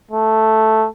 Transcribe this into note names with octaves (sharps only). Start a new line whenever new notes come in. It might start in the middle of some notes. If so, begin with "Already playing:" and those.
A3